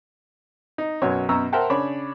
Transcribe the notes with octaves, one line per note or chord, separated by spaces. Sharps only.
D#4
B1 F#2 F#3 C#5
F#2 B2 A#5 C#6 E6
A#4 C5 E5 F#5 G5 A5
C#3 D4 C#5 B5